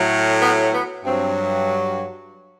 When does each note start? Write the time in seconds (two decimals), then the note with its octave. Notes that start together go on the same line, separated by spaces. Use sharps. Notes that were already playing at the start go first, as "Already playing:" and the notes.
Already playing: A2 F#3
0.42 B3
0.73 B3
1.04 G2 F#3 C4